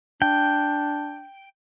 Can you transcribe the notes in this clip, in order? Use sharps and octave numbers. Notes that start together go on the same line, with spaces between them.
D4 G5